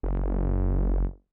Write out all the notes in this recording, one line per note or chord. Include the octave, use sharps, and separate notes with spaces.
F#1